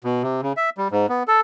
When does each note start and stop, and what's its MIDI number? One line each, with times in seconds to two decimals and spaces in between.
0.04 0.23 47
0.23 0.41 48
0.42 0.53 49
0.57 0.70 76
0.78 0.88 55
0.91 1.07 44
1.09 1.23 59
1.28 1.41 69